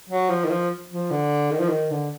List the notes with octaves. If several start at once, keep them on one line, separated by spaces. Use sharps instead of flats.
F#3
F3
D#3
F3
F3
D3
D#3
F3
D#3
D3